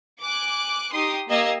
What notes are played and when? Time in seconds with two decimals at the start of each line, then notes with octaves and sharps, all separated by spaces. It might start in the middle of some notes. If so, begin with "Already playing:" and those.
0.22 G#5 D6 F#6
0.92 D#4 G4 C6 D#6
1.29 A#3 G4 D#5 F5 E6 G#6